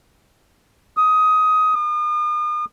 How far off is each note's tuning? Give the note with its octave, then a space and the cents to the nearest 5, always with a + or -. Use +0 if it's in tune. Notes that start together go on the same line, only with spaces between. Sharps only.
D#6 +15
D#6 -40